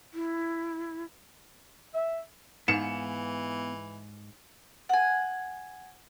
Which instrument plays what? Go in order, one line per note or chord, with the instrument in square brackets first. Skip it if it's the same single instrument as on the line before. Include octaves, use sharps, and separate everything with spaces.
[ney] E4
[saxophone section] E5
[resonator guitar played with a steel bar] G#2 [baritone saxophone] E3 [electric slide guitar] B3 B4 F5 [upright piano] C#7 E7
[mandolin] F#5 G#5